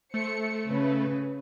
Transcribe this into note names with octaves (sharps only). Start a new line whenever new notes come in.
A3 C5 C#7
C#3 B4